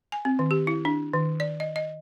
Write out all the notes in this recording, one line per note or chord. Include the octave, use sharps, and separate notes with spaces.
G#5
C4
D#3
G4
E4
D4
D#3
D5
D#5
D#5